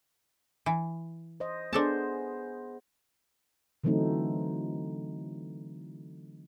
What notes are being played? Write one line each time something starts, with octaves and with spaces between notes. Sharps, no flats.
E3
C5 D#5
B3 D4 G#4 A4 C5 A5
D3 E3 F#3 A3 C4 D#4